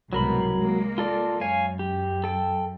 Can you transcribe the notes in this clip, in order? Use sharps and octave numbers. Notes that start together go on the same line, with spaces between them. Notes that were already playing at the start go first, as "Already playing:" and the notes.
C2 G#2 B2 F#3 A#4 B5
G#3 A#3
F4 A4 D5
F#2 C#5 F5 G#5
G4
A4 G5